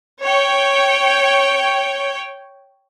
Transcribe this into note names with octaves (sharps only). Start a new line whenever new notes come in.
C#5 G5